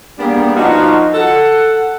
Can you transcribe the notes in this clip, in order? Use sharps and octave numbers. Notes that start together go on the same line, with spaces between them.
G3 A#3 B3 D4 G4 G#4
F3 D#4 F4 F#4
A4 F#5